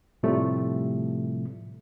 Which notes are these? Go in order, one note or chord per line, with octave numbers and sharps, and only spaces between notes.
A2 C3 F3 G3 A3